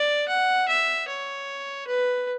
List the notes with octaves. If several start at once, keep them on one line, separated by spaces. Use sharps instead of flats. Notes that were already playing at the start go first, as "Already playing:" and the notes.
Already playing: D5
F#5
E5
C#5
B4